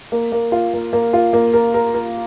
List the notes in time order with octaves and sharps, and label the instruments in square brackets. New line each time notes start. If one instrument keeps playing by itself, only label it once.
[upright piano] A#3
A#3
F4
A#3
A#3
F4
A#3
A#4
A#4
A#4